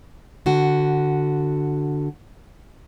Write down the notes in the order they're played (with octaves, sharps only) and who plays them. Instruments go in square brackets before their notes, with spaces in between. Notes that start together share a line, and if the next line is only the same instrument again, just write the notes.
[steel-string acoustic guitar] D3 F#4